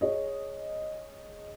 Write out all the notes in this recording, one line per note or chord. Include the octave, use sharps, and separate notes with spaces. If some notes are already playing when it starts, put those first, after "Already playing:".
G#4 C#5 D#5